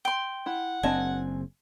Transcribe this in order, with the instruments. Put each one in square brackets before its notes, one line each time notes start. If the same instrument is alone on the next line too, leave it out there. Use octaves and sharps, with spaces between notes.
[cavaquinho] G5 C6
[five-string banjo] E4 [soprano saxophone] F#5
[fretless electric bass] F#1 C4 [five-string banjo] D4 D#5 A5 [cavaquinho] G#5